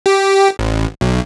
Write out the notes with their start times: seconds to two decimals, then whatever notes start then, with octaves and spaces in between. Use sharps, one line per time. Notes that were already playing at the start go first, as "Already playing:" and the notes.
0.06 G4
0.59 A1
1.01 B1